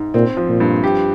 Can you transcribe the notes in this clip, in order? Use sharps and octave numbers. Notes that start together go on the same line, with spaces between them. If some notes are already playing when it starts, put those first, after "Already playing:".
Already playing: G#2
A#2 C4
F3
A#2
G2
G4